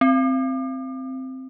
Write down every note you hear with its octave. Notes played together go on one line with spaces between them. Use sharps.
C4